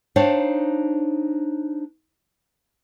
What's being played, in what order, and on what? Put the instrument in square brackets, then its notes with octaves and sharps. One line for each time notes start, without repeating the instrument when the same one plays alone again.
[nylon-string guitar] D4 D#4 C5 C#5 F5 G5